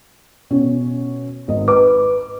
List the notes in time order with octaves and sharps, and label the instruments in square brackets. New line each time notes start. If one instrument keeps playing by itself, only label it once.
[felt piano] B2 C#4
G#1 D#5
[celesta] B4 [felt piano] D6